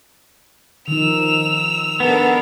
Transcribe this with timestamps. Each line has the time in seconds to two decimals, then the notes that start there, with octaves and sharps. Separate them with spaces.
0.88 D#3 F3 D#4 E6 F7
2.00 B3 D4 A4 A#4